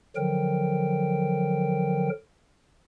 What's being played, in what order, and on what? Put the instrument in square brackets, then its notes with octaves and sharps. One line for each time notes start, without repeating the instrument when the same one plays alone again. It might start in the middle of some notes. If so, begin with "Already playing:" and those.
[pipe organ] D3 F3 F#3 A#4 G5